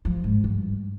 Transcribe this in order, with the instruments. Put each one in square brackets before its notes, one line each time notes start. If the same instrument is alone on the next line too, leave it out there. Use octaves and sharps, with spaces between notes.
[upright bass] F3
G#2
G2